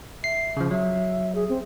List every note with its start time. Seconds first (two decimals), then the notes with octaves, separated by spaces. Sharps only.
0.24 E5 C7
0.57 C#3 F3
0.71 F#3 E5
1.35 G#4
1.49 C4